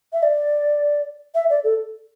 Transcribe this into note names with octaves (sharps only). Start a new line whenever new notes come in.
E5
D5
E5
D5
A4